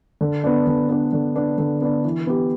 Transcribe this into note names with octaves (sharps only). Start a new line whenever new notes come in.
D3
B3 D4
D3
B3 D4
D3
B3 D4
D3
B3 D4
E3
B3 G4